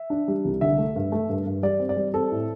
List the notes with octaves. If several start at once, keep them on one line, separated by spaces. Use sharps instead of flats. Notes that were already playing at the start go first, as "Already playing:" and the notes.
Already playing: E5
D4
G3
C2
D3 E5
A3
G2
A3
G2
G2
G3 D5
C4
D5
G3
C4 A4
A2